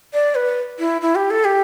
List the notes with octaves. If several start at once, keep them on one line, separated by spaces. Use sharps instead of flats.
D5
B4
E4
E4
G4
A4
G4